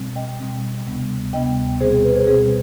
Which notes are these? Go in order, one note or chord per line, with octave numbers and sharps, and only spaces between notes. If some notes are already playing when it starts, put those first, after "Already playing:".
Already playing: B2 G3 C4
D#5 G5
B2 G3 C4
D2 C3 G3 B3
D2 C3 G3 B3 D#5 G5
B2 G3 C4 G#4 C5
G#4
B4
G#4 C5
B2 G3 C4 G#4 C5